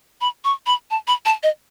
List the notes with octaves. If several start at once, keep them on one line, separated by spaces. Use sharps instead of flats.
B5
C#6
B5
A5
B5
A5
D#5